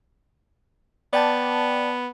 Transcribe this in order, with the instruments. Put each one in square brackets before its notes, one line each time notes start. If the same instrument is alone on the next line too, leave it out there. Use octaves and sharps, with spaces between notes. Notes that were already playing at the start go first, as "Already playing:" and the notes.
[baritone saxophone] B3 [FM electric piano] D5 G5 A5